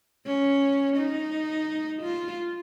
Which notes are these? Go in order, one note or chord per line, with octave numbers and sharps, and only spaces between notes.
C#4
D#4
F4